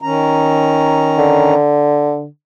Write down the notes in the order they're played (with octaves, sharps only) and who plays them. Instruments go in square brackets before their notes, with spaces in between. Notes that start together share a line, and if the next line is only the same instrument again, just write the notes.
[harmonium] D#3 C#4 A#5
[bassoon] D3